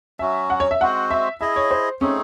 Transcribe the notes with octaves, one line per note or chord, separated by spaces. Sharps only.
F#3 C#4 F#4 E5
F#5
C#5
E5
G#3 C4 F#4 C5 F#5
E5
E4 G#4 D#5 E5
C#5
C5
A3 C4 C#4 D#4 G#4